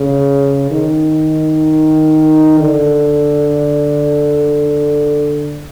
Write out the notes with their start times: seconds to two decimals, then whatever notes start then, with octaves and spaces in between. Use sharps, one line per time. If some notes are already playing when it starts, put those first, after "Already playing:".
Already playing: C#3
0.71 D#3
2.60 D3